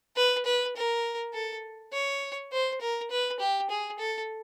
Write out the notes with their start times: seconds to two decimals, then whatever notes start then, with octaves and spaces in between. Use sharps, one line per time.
0.16 B4
0.45 B4
0.76 A#4
1.34 A4
1.93 C#5
2.52 C5
2.81 A#4
3.10 B4
3.40 G4
3.70 G#4
3.99 A4